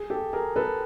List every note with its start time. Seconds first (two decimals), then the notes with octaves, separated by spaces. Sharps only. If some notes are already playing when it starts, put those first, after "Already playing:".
Already playing: G#4
0.10 G4 A4
0.33 G#4 A#4
0.56 A4 B4